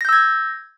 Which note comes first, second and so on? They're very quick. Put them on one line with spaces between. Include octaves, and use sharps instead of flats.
A#6 G6 E6 G#6